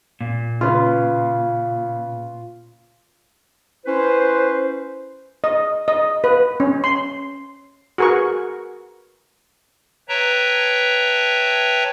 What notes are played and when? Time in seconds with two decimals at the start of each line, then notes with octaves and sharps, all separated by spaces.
0.21 A#2
0.61 C#3 F4 B4
3.86 C#4 E4 B4 C5
5.44 D#5
5.88 D#5
6.24 B4
6.60 C#4
6.84 C6
7.98 F#4 G#4 A#4 B4 C#6
10.09 B4 C#5 E5 G5 A5 A#5